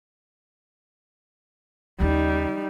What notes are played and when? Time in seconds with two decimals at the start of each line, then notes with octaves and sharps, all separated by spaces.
2.00 D#2 C#3 G3 D#4